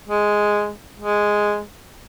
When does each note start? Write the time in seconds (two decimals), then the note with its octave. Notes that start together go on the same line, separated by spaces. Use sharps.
0.08 G#3
0.98 G#3